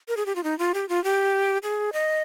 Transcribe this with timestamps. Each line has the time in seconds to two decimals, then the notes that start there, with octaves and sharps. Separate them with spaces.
0.08 A#4
0.17 G#4
0.26 G4
0.36 F4
0.44 D#4
0.59 F4
0.74 G4
0.89 F4
1.04 G4
1.63 G#4
1.93 D#5